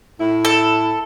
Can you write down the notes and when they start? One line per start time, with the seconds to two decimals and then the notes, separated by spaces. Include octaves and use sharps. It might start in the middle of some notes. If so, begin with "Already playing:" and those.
0.19 A2 E4
0.45 A4